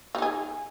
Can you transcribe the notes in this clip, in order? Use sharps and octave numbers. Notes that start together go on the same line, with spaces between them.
D#4 F4 G#4